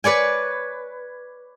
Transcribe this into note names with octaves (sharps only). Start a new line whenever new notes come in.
B4 C#5 D5 G#5